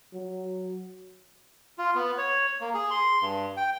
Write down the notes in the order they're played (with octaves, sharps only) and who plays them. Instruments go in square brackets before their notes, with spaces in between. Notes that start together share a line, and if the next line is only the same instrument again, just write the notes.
[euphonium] F#3
[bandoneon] F4
B3
C#5
A#3
G#4
C6
G2
G5